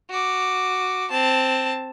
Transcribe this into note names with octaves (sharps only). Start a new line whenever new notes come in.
F#4 D6
C4 A5